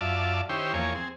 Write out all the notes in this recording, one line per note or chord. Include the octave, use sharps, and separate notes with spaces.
F#2 F4 D5 E5 A5
D#3 C#4 E4 G4 C5
E2 F3 A#3 C#5 G#5
C4 G#4